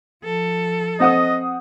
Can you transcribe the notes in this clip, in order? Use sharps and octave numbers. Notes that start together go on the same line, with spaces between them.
F3 A4
C4 D#5 F#5 D#6